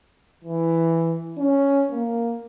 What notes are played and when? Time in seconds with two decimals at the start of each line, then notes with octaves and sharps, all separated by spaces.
0.45 E3
1.38 C#4
1.91 A#3